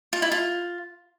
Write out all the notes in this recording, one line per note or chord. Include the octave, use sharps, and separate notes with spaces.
F4
E4
F4